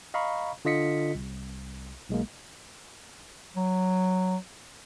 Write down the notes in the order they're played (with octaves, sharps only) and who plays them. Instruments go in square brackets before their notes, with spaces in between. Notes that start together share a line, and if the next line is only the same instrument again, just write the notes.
[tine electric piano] D#5 F5 A#5 B5 C#6
D3 F4 D#5 B6 C#7
C2
B1 G#3 A#3
[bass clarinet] F#3